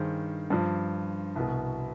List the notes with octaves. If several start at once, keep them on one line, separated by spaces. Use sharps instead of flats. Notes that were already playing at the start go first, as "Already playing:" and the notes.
Already playing: G2 D#3 G#4 C5
G2 F3
C2 B2